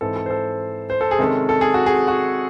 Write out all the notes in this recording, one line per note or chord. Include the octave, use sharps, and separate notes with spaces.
G#2 E3 C4 A4
A4
C5
A4
C5
A4
G#4
C3 D#3 G#3 C#4 A4
A4
G#4
F#4
G#4
F#4